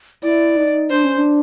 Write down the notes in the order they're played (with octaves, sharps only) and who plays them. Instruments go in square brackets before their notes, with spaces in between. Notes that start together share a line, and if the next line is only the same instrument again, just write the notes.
[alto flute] E4 [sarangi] D5
[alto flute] D#4
[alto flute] D4 [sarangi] C5
[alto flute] C#4
D4